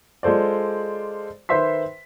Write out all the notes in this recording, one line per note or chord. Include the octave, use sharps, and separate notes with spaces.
G#3 F4 A4 C5 D5
D#3 B4 C5 E5 C6 B6